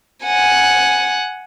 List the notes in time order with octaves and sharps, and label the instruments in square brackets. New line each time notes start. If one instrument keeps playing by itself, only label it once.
[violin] F#5 G#5